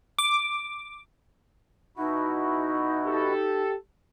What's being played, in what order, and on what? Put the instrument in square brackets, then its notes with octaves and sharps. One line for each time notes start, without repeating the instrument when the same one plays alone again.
[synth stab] D6
[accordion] B2 E4 F#4 [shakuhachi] D#4
[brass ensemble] G4 A4